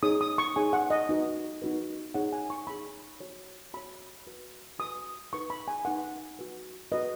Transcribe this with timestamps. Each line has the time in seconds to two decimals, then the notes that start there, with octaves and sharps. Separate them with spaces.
0.03 D#4 G#4 C#5 D#6
0.21 D#6
0.38 C#6
0.56 D#4 G#4 C#5 G#5
0.73 F#5
0.90 D#5
1.09 D#4 F#4 B4
1.62 D#4 F#4 B4
2.14 D#4 G#4 C#5 F#5
2.33 G#5
2.50 C#6
2.67 D#4 G#4 C#5 B5
3.20 F#4 C#5
3.74 F#4 C#5 B5
4.27 F#4 B4
4.79 F#4 B4 D#6
5.33 D#4 B4 C#6
5.50 B5
5.68 G#5
5.85 D#4 B4 F#5
6.39 F#4 B4
6.92 F#4 B4 D#5